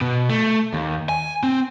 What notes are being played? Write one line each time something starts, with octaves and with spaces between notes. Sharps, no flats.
B2
A3
D#2
G#5
C4